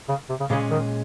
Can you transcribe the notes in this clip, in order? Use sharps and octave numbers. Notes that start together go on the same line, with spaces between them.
C#3
C3
C#3
A#2 C#3 G#3 C#4 G#4
D#3